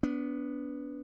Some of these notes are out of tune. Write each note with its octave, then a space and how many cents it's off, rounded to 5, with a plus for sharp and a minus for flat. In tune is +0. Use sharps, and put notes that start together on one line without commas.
B3 +0 D4 -30